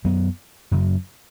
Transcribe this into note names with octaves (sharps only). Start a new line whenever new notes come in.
F#2 F#3 B3
F#2 C#3 F#3